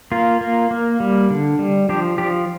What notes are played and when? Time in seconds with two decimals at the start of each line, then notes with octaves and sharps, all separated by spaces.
0.12 A#3 F4
0.41 A#3
0.71 A#3
1.00 G3
1.30 D3
1.59 G3
1.89 F3 D4 G4
2.18 F3 D4 G4